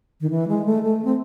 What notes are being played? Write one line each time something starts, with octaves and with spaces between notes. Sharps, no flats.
D#3
E3
G#3
A3
A3
C4